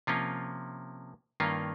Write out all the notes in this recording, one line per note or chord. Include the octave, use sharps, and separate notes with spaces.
C3 F3 A#3 C#4 F4
G2 D#3 A#3 C#4 F4